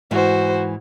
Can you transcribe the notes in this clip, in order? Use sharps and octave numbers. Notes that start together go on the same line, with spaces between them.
G#2 E3 F#4 C5